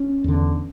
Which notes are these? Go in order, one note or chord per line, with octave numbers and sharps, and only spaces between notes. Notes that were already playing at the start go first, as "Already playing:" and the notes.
Already playing: C#4
E2 D3